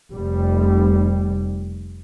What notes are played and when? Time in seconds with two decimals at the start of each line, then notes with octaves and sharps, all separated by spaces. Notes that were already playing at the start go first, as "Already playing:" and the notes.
0.11 F1 G3